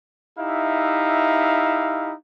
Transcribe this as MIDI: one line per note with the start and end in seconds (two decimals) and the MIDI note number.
0.39 2.14 63
0.39 2.14 64
0.39 2.14 67
0.39 2.14 76
0.39 2.14 77